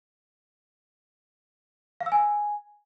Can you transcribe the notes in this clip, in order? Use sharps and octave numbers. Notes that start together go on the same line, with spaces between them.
F5
E6
G#5